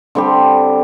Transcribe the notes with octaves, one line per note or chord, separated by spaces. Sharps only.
D3 G3 C4 G4